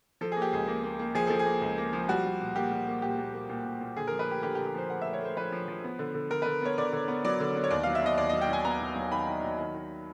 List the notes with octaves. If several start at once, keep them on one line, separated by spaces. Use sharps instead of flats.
F3 A4
A#3 G#4
G4
C#2 G#4
A#3
A#3
A#3
F3 G#4
F3 A4
G#4
A#3
C#2
A#3
F3
G3 F#4
G3
A#2
A#3 G4
G3
A#3
A#2 G4
A#3
A#3
A#2
A#2
A#2
D3 G#4
F3 A#4
B4
A3 G4
D3 G4
G4
D3
G4
F3 C5
A3 F#5
A3 E5
C#5
A3 C5
F3 B4
F3
F3
B3
D3
D3
D3 A#4
D3 B4
B3 C#5
D3 D5
D3
B3
F#3 D5
D3
B3
C#5
D#2 D5
F#3 F5
E5
B3 D#5
D#2 D5
F#3 D#5
G5
F#3 G#5
B3 A#5
F#3
F#3
D#3 B5
D#3
F#3
D#3
D#3